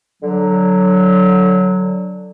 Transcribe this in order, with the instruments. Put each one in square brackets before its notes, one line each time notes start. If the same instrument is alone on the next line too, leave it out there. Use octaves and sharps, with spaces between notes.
[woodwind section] D3 F#3